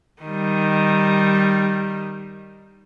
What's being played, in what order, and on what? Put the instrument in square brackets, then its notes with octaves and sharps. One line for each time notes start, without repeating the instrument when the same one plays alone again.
[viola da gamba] D#3 G3